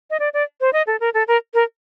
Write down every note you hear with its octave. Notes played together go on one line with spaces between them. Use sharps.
D#5
D5
D5
C5
D#5
A4
A#4
A4
A#4
A#4